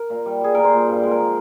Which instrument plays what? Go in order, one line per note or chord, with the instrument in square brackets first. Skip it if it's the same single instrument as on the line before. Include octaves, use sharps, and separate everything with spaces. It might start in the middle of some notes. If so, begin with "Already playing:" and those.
Already playing: [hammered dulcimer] A#4
A#2
G3
G3 G#4
A#2 A#4
C5
A#2
G2
G#3
A#4
F3